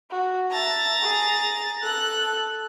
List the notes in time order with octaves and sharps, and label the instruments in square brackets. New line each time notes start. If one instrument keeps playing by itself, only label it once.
[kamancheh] F#4
[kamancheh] E5 A5 [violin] A#5 A6
[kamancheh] G#4
[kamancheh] A4 [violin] F#6